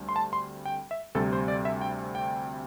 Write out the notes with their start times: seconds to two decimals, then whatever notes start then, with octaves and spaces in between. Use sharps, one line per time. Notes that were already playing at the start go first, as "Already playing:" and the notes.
Already playing: D2 D3 G3 C4
0.09 C6
0.16 A5
0.33 C6
0.65 G5
0.91 E5
1.15 D2 C3 G3 C4 A4
1.33 C5
1.48 D5
1.65 E5
1.81 G5
2.15 G5